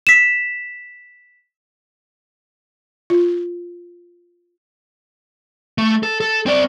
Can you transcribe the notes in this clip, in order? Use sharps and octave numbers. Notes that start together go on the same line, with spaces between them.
B6 E7
F4
A3
A4
A4
C4 D5